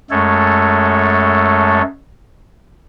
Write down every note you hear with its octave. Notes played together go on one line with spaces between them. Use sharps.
F#2 G#3 A3 A4 C#5